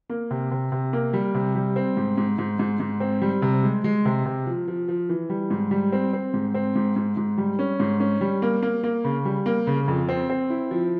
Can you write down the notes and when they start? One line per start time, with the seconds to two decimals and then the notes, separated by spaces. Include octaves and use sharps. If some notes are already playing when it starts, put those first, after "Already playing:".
0.09 A#3
0.31 C3
0.51 C3
0.72 C3
0.93 A#3
1.13 G3
1.34 C3
1.55 G3
1.76 C4
1.97 G#2
2.18 G#2
2.38 G#2
2.59 G#2
2.80 G#2
3.00 C4
3.22 G3
3.42 C3
3.63 G#3
3.84 G#3
4.05 C3
4.26 C3
4.46 F3
4.68 F3
4.88 F3
5.09 E3
5.30 G3
5.50 G#2
5.71 G3
5.92 C4
6.13 C4
6.34 G#2
6.54 C4
6.76 G#2
6.96 G#2
7.17 G#2
7.38 G3
7.59 C#4
7.80 G#2
8.00 C#4
8.21 G3
8.42 A#3
8.63 A#3
8.83 A#3
9.04 C#3
9.25 G3
9.46 A#3
9.67 C#3
9.88 F2
10.09 C4
10.30 C4
10.50 E4
10.71 F3